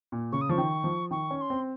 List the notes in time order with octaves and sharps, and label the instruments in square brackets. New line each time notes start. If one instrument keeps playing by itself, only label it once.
[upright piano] A#2
[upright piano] C#3 [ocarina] C#6
[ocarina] D#6
[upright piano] F3 [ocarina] C#6
[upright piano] D#3
F3
[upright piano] D#3 [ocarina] C#6
[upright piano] C#4
[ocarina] C#6
C6
[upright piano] C4